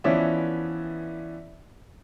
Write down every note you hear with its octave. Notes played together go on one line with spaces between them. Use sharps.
E3 F3 B3 C#4 D5 E5